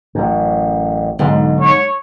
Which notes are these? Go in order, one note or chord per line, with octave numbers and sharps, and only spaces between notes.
A1 F#2
B1 G#2 D3 G#3
C#5